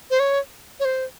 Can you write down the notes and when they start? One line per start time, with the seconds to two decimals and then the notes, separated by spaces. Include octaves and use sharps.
0.11 C5
0.20 C#5
0.80 C#5
0.85 C5